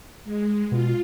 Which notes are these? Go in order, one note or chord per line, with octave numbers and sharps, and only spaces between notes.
G#3
B2 F4